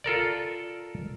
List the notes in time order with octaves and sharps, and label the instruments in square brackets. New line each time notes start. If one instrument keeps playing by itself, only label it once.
[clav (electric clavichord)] F4 A4 A#4 D5